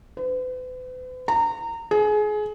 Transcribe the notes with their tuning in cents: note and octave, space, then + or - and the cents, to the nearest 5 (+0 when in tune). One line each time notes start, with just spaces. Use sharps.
B4 +45
A#5 -25
G#4 +25